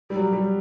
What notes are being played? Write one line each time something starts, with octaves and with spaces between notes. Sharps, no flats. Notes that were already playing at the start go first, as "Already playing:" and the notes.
G3
F#3
G3